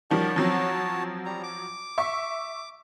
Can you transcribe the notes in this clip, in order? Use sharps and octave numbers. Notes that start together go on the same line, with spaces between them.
D#3 F3 G3 F#4 C#5 A5
F3 F#3 C4
G3 A#5
D6
E5 C#6